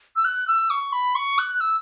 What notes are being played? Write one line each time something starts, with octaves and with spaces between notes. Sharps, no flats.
E6
F#6
E6
C#6
B5
C#6
F#6
E6